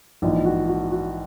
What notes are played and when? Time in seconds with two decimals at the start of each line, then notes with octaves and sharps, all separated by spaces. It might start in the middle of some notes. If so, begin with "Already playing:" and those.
0.22 A#1 G#2 E3 F4
0.45 F#4
0.68 F#4
0.92 F#4